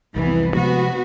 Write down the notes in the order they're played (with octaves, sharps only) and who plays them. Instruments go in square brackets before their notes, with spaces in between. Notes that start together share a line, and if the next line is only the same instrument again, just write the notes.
[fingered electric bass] C2 F2 [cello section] E3 B3
[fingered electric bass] C3 F3 G#3 [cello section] B3 F#4